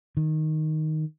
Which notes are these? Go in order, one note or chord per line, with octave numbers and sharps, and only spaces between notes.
D#3